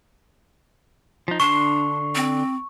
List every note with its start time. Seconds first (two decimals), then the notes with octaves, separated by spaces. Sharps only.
1.28 F3 D#4
1.40 D3 D4 C6 C#6
2.15 C4